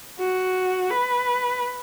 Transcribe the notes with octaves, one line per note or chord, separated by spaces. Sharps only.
F#4
B4